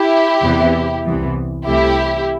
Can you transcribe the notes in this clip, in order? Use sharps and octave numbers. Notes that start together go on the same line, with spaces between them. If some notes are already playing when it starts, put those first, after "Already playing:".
Already playing: E4 G4
E2 C3 E3 B3
C2 C3 E3 B3
C2 C3 E3 A3 E4 G4